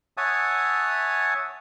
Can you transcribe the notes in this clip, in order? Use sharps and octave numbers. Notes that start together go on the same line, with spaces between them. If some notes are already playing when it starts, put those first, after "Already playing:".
C#5 E5 F#5 G#5 A5 D#6